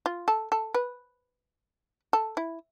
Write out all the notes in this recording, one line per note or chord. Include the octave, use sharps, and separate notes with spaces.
F4
A4
A4
B4
A4
E4